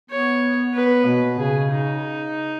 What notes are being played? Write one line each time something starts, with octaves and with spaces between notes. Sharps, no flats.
B3 C#5
B3 B4
B2
C#3 G#4
D#4